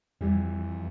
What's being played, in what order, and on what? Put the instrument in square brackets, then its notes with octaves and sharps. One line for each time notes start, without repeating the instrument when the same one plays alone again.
[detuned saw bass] F2 [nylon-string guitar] E3 G3